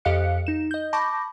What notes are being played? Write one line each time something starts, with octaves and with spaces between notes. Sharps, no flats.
F2 G4 D#5 F5 F#6 C#7
D#4 E7
D#5 G6
A5 B5 C#6 D6 G6 A#6